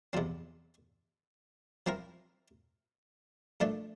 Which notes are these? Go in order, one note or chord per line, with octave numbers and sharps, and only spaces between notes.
E2 C3 F3 C4
F3 C4 E4 A#4
A#2 F3 A3 D4